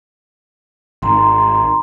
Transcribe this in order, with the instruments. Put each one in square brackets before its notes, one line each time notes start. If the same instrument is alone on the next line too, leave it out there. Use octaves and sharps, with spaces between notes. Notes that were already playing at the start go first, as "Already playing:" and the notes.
[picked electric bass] G#1 [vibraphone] A#5 C6